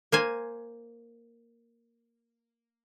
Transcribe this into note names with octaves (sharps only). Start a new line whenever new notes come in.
A#3 C5 G#5